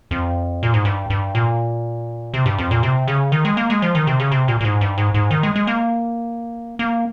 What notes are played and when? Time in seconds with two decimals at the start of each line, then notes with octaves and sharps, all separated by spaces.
0.11 F2
0.63 A#2
0.74 G#2
0.85 G2
1.10 G2
1.35 A#2
2.34 C3
2.46 G2
2.58 F2
2.71 A#2
2.83 C3
3.08 C#3
3.32 D#3
3.45 G#3
3.57 A#3
3.70 G#3
3.82 F3
3.95 D#3
4.07 C3
4.20 C#3
4.32 C3
4.48 A#2
4.61 A#2
4.65 G#2
4.81 G2
4.98 G#2
5.14 G#2
5.31 D#3
5.43 G#3
5.56 G#3
5.67 A#3
6.79 A#3